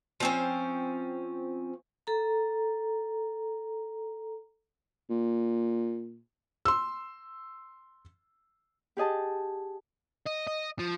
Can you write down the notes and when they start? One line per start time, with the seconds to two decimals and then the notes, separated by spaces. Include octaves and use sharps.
0.20 F3 C4 C#4
2.07 A4 A#5
5.10 A#2
6.65 C6 E6
8.97 G4 G#4 D#5 A5
10.27 D#5
10.47 D#5
10.79 F3